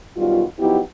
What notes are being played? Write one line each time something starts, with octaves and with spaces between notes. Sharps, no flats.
F#2 B2 D#3 G3 F4
F3 F#3 B3 D#4 E4 G4